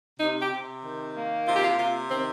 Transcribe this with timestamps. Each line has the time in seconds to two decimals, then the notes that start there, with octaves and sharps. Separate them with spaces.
0.19 C3 D#4
0.41 G4
0.51 C3
0.83 D#3
1.15 A#3
1.47 C3 F4
1.55 G4
1.64 F4
1.78 C3 F4
2.10 D#3 C4